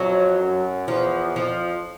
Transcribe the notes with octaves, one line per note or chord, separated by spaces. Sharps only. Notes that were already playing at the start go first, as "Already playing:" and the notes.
Already playing: F2 F#3
F#2
E2 F3
F2 F3